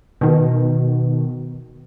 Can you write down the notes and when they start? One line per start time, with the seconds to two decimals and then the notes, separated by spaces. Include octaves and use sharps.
0.21 B2 D#3